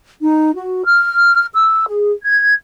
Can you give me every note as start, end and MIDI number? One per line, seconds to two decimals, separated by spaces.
0.23 0.55 63
0.55 0.84 66
0.85 1.45 89
1.55 1.84 88
1.87 2.12 68
2.23 2.54 92